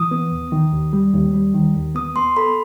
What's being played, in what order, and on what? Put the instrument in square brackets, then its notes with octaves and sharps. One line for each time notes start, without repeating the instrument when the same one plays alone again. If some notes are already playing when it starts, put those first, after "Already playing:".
Already playing: [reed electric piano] E3 [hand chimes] D#6
[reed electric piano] B3
D#2
D#3
D#2
G3
D#2
G3
D#3
D#2
[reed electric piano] B3 [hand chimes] D#6
[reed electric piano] B3 [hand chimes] C6
[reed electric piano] A4 [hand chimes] B5